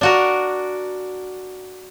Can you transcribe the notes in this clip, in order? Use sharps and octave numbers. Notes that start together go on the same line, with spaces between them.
D4 F#4 A#4